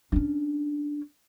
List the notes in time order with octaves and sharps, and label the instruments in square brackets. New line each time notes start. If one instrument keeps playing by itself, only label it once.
[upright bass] C#4 D4